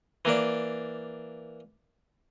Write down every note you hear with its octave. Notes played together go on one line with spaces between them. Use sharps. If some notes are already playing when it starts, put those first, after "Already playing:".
E3 A#3 D4 D5